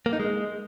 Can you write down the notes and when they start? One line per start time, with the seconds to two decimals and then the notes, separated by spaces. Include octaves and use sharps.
0.06 A#3
0.13 D#4
0.20 G#3